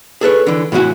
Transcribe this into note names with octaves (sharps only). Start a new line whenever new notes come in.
G#4 A4 B4 C#5
D3 E3
A2 E3 F#3 E4 F#4 G#5